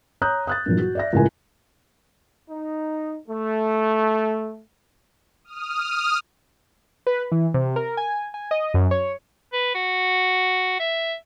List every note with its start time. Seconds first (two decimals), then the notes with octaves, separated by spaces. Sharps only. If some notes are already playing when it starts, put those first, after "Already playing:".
0.21 C#5 A#5 D#6 F#6 G6
0.47 D#6 F#6 A6
0.66 G2 A#2 E3 F#3
0.79 F#4
0.95 D5 E5 A#6
1.13 C#2 A2 C#3 F4 A#4 G#5
2.50 D#4
3.28 A3
5.44 D#6 F6
7.07 B4
7.32 E3
7.54 C3
7.76 A#4
7.97 G#5
8.34 G#5
8.51 D#5
8.74 F#2
8.91 C#5
9.53 B4
9.75 F#4
10.80 E5